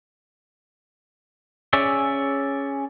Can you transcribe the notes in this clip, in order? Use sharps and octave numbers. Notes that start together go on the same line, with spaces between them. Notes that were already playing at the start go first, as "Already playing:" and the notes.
C#4 G#4 C#5 D5 E5